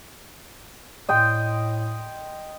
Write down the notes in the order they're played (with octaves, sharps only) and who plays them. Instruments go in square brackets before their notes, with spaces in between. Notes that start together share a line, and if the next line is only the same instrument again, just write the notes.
[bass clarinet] A2 [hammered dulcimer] D#5 G5 C6